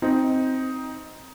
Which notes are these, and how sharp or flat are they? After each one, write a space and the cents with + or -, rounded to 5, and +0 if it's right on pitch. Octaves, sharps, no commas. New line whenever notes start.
C4 +0 D#4 +10